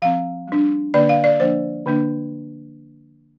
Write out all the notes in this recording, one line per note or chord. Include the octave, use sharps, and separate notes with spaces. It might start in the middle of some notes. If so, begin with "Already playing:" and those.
F3 C4 F5
G3 D4
D3 A#3 D4 D5
F5
D5
F3 A#3 D4 C5
D3 A#3 D4